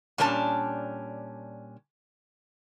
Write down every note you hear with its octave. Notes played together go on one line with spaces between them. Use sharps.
A#2 G3 C#4 D4 A#4 A5